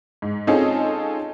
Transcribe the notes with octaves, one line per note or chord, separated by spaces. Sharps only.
G#2
C4 C#4 D#4 F4 G#4 A4